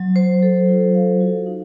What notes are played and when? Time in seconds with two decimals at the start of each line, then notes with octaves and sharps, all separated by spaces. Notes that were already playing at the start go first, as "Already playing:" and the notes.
Already playing: F#3
0.16 C5
0.43 A4
0.69 F4
0.94 F5
1.20 F#4
1.46 D#4